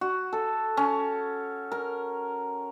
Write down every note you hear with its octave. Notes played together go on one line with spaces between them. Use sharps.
F#4
A4
C#4
A#4